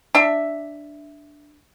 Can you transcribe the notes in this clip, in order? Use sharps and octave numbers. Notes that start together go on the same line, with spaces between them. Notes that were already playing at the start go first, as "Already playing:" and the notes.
D4 E5